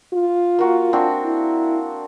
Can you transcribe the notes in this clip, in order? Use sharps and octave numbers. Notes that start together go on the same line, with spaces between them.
F4
A#3 F#4
C4 D4 F#4
E4